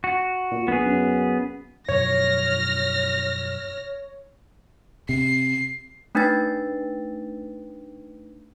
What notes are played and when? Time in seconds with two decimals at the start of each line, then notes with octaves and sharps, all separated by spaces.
0.04 F#4
0.51 A#2
0.68 A#1 B3 G#4
0.85 F#2
1.89 F#2 B2 F3 C#5 F6 A#6
5.09 C3 C7
6.15 A3 D4 D#4 B4 G5 A6